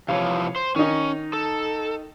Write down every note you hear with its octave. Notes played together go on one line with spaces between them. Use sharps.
C3 E3 F3 C#5 F5
C5
D#3 C#4 D#4
A4